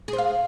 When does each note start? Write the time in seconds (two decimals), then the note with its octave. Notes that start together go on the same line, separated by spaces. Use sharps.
0.08 G#4
0.13 C5
0.18 F5